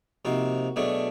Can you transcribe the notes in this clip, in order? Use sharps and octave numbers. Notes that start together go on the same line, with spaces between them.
C3 F3 A#3 D#4 F#4
B2 F#3 A3 D4 G#4